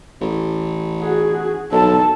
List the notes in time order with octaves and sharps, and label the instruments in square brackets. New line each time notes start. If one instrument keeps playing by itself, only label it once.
[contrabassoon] A1
[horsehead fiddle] F#4 G#4
[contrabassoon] B1 [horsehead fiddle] A4 A5